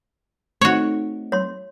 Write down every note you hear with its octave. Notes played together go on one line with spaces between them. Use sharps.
A3 C4 D#4 F#4 C#5
C#5 C6